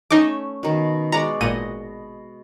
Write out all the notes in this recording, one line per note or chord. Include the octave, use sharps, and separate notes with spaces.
A3 C#4 D#4 E5 D6
B2 D#3
G#3 F#4 D5 A#5
G#1 A#2 D#5 F#5 D#7